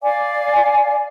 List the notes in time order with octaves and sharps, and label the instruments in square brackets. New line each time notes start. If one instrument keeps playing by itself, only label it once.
[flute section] D5 F5 G#5 D6